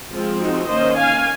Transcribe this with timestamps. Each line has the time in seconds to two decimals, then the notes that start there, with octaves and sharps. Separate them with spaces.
0.11 F3 G#3 C4 F4
0.40 D#4 F#4
0.69 D#3 A#3 C#4 C5 D#5
0.96 F5 G#5